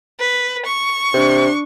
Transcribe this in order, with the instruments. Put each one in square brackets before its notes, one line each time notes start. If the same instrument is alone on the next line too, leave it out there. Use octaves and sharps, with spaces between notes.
[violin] B4
C#6
[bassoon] C3 [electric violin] D4